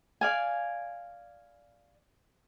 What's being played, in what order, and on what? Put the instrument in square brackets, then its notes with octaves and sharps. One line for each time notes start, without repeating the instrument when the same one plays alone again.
[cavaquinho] D5 F5 G#5